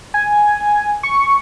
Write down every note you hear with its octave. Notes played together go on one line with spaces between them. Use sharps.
G#5
C#6